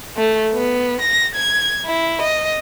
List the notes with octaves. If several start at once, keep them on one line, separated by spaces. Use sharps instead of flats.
A3
B3
A#6
G#6
E4
D#5